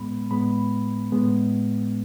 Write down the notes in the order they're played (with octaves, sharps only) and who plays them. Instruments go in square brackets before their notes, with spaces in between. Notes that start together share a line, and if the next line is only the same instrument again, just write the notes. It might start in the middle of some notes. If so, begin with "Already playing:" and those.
Already playing: [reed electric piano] A2 G#3 B3 B5
A2 G#3 B3 B5
A2 G#3 B3